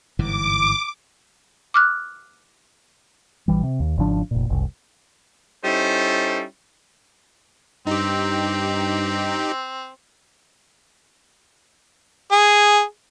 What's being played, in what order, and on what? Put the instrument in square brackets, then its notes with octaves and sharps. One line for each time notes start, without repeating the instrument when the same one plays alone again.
[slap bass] G1 G#2 E3 [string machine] D6
[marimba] D6 F6 F#6
[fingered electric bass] A#1 E3 G3
C3
D#2
G#1 C#3 F3 D4
F1 A#2
F#1 C2
[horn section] G3 C#4 D#4 E4 A4 C5
[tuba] G2 [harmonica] C4 [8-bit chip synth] D#4 G4
[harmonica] G#4